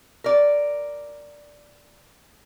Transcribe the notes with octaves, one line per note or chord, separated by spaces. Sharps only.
A#4 D5